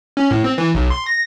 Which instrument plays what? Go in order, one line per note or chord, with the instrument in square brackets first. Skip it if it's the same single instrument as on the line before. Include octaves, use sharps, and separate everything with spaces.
[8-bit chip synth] C#4
A2
C4
E3
B1
C6
A#6